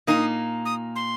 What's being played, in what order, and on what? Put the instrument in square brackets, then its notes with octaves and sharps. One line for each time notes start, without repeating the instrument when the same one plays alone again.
[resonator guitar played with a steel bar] A#2 A#3 D#4 [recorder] D#6
[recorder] D#6
C6